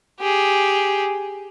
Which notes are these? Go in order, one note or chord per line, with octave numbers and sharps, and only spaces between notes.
G4 G#4